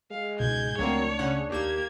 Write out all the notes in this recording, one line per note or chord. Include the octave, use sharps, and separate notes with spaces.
G#3 F5
C#2 G#2 B2 G6 G#6
C#2 F#3 A3 A#3 C4 D4 C#5
C#3 C#4 F#5
D#2 A#3 G4 G#6 E7